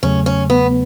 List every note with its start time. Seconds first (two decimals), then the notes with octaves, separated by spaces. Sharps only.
0.03 E2 C#3 F#3 A3 C#4
0.26 C#4
0.50 B3